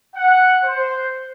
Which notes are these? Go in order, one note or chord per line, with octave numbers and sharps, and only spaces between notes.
F#5
C5